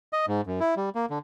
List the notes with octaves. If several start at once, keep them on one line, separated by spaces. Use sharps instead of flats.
D#5
G#2
F#2
E4
G3
A#3
D3